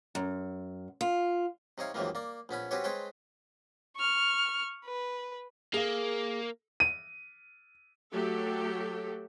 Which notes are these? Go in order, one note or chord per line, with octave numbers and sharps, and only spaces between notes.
F#2
F4
C3 D#4 C#5 F5
C#2 F#2 C3 D#3 E3 A#3
A#3 D5
A#1 B3 C#4 B5
C4 C#4 F#4 G4 B4 C#5
G#3 C4 B4 C#5 G5 A5
C#6 F6
B4
A#3 G#4 F5
D#7
F#3 A3 G4 A4